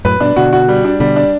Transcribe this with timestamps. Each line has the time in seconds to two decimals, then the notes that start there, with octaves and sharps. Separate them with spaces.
0.05 F#2 A2 B4
0.20 G2 B2 D4
0.36 B2 D3 F#4
0.53 F#4
0.68 G3
0.84 D4
1.00 B2 D3 G3
1.16 D4